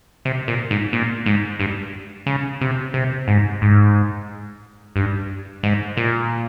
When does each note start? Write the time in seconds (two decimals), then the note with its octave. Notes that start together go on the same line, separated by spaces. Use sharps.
0.25 C3
0.48 A#2
0.71 G#2
0.93 A#2
1.26 G#2
1.60 G2
2.26 C#3
2.61 C3
2.94 C3
3.28 G#2
3.62 G#2
4.96 G2
5.63 G#2
5.97 A#2